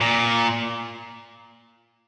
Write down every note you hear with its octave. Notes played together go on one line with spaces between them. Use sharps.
A#2